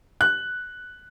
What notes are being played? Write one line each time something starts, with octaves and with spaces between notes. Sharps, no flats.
F#6